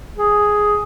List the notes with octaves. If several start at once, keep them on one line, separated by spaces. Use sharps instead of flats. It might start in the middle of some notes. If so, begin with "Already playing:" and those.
G#4